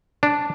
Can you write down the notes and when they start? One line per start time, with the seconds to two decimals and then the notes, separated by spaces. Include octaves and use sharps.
0.23 D4